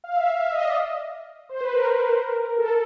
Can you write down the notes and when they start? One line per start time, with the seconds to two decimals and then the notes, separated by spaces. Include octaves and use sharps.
0.04 F5
0.16 E5
0.28 F5
0.40 E5
0.52 D#5
0.65 D5
1.49 C5
1.61 B4
1.74 A#4
2.58 A4